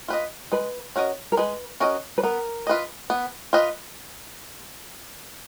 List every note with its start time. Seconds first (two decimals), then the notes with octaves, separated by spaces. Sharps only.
0.08 F4 B4 D#5
0.52 G#3 B4
0.96 C#4 F#4 A#4 D#5
1.32 A#4
1.37 G#3 B4
1.80 C#4 F#4 A#4 D#5
2.18 B4
2.23 B3 A#4
2.67 F4 B4 D#5
3.10 B3
3.53 F4 B4 D#5